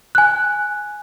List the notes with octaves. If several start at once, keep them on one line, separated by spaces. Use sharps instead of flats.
G#5 F#6